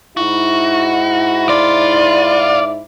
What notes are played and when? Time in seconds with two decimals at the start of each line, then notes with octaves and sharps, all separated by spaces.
0.17 G#2 D#4 E4 F#4
1.49 F4 D5